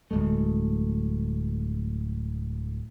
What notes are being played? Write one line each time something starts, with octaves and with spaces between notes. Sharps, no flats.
D1 D#2 G#3 A3